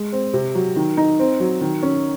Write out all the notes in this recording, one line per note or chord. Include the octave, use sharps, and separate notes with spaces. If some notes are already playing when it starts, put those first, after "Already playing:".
Already playing: G#3
C4
C3
F#3
D#3
D#4
C4
F#3
D#3
C#4